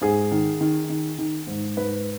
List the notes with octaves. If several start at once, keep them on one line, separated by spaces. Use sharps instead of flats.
G#2 G#4
D#3
D#3
D#3
D#3
G#2
G#2 B4